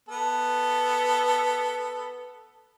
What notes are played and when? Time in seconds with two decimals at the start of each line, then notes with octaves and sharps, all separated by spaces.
0.09 B3 A4